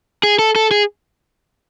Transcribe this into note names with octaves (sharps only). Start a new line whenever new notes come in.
G#4
A4
A4
G#4